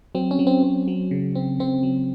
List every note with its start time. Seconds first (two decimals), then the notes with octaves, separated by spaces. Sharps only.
0.15 F#3 C4
0.31 C#4
0.39 F#3
0.47 C4
0.63 C4
0.88 F#3
1.11 C#3
1.35 C4
1.59 C#3 C4
1.83 F#3